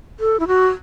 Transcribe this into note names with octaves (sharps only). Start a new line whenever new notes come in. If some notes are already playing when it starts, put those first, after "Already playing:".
A4
E4
F#4